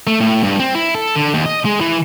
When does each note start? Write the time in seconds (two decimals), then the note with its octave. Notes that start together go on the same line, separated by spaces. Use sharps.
0.07 A3
0.21 A2
0.43 G2
0.60 C4
0.75 E4
0.95 A4
1.16 D3
1.34 D#2
1.46 D#5
1.65 G#3
1.81 E3